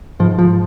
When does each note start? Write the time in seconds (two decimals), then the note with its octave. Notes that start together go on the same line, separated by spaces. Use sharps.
0.20 G#2 F3
0.39 F3